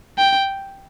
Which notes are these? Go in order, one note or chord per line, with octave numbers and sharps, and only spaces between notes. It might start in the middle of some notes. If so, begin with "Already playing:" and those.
G5